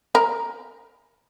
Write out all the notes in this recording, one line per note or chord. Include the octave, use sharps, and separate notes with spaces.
A#4